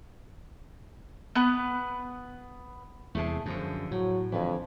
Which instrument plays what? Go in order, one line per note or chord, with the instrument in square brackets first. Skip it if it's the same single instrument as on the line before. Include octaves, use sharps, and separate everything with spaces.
[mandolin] B3 B4
[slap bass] E2 C3 [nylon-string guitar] A3 G#4 A5
[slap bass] F#2 D3 [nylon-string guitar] F3 G#4
[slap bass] A2 [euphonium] F#3
[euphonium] F2 [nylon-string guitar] D3 E3